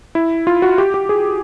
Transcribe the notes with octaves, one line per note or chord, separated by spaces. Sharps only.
E4
F4
F#4
G4
G4
G#4